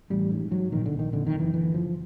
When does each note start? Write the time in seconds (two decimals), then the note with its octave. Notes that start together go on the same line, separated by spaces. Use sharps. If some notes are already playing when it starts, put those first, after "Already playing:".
0.10 A1 G3
0.31 G#2
0.51 G#2 F#3
0.72 A#1 D#3
0.86 D3
0.92 A#1
0.99 D#3
1.13 F2 D3
1.27 D#3
1.33 F#1
1.40 E3
1.54 D3 E3
1.74 F#1 F3